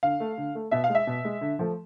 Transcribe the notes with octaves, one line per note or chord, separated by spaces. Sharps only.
D3 F5
A3
D3
A3
B2 E5
F5
G#3
E5
B2
G#3
D3
F3 A3